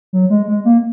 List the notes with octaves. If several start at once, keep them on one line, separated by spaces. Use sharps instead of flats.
F#3
G#3
G#3
A#3